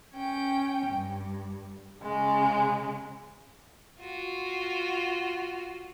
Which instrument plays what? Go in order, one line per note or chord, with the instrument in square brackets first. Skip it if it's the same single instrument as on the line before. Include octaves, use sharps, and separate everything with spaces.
[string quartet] C#4 G5
G2
C#3 G#3
[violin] F4 F#4